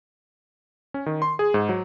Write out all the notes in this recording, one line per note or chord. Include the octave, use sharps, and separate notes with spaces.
C#4
D#3
C6
G#4
G#2
F#3